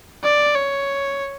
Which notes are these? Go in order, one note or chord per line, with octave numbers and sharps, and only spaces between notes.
D5
C#5